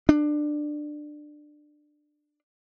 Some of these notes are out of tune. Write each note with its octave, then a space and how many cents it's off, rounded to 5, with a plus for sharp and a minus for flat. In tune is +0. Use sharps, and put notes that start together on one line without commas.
D4 +20